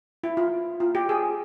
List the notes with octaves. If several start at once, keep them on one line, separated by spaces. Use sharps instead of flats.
E4
F4
F4
G4
G#4